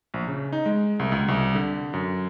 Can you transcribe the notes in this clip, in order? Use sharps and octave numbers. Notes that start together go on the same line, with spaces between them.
A#1
C#3
D#4
G#3
C2
C#2
C2
D3
F#2